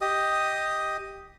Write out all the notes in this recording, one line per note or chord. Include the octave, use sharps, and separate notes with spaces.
G4 D#5 D#6